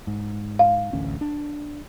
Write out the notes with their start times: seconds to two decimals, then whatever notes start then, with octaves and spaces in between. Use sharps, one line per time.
0.07 G#2
0.59 F5
0.93 A1 D2 C#4
1.21 D4